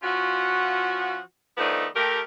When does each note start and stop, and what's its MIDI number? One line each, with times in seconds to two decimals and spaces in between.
0.03 1.18 53
0.03 1.18 61
0.03 1.18 65
0.03 1.18 66
1.58 1.86 51
1.58 1.86 53
1.58 1.86 57
1.58 1.86 59
1.58 1.86 62
1.58 1.86 63
1.94 2.20 57
1.94 2.20 67
1.94 2.20 70